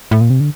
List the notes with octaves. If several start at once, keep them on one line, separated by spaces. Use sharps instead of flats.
A2
A#2
C3
D3